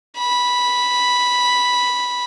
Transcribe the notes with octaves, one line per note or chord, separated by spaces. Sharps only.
B5